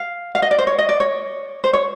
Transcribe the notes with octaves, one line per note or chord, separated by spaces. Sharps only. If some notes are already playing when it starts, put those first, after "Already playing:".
Already playing: F5
F5
D#5
D5
C5
C#5
D#5
D5
C#5
C5
C#5